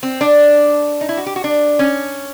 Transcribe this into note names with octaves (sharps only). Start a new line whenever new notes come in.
C4
D4
D#4
E4
F#4
G4
F#4
D4
C#4